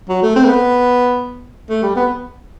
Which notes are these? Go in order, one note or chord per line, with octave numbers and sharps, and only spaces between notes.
F#3
A3
C4
A3
B3
A3
G3
B3